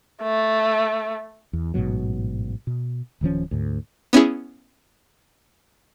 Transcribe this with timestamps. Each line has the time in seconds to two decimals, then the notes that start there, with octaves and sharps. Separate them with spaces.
0.23 A3
1.53 E2
1.74 A1 G#2 B2 F#3
2.67 B2
3.21 D1 D#3 F3 C#4
3.51 D2 G#2
4.13 B3 C#4 E4 G#4